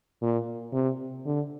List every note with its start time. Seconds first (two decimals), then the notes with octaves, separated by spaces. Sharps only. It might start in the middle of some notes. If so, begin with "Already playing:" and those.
0.22 A#2
0.73 C3
1.26 D3